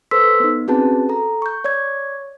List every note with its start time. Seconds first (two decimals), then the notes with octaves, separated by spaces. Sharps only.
0.11 A4 B4 C5 C6 E6 B6
0.40 B3 D#4
0.68 C4 C#4 F#4 G#4 B4 A5
1.09 A4 A#5
1.42 C#6 G6
1.64 C#5 D5 C#6 G#6